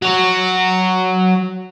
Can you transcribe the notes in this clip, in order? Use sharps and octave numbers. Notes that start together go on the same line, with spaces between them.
F#3 F#4